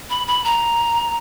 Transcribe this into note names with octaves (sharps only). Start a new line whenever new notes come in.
B5
B5
A#5